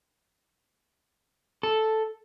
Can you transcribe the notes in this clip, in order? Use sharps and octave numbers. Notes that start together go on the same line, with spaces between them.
A4